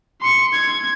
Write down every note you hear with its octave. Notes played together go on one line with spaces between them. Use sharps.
C6 C#7
G#6